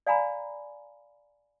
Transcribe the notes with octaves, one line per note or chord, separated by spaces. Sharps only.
D5 F5 G#5 A#5 B5